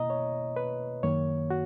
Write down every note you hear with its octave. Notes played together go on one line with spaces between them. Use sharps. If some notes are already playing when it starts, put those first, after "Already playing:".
Already playing: B2 A#3 E4 D#5 A#5
C#5
B4
F#2 D#3 A#3 C#5
F#4